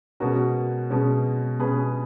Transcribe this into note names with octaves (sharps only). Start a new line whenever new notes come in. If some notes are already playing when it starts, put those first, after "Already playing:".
B2 G#3 C#4 F#4 A#4
B2 G#3 C#4
B2 G#3 C#4 G#4 B4